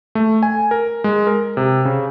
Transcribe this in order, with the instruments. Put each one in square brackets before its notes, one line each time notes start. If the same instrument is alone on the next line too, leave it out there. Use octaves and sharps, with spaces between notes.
[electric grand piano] A3
G#5
A#4
G#3
A#4
C3
C#3